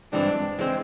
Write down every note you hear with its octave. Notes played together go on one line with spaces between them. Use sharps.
G2 E3 G#3 C4 D4
E3 G#3 C4